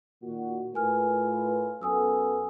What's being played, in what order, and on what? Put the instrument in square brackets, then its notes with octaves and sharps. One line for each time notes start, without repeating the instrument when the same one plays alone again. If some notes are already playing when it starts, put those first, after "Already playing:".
[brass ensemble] A#2 D#3 F#4
[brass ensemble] A2 F4 B4 [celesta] A#4 G#5 F6
[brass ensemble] F#2 B3 A4 [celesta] G#5 D#6 E6